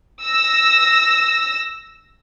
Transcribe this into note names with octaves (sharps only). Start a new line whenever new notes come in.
E6 A#6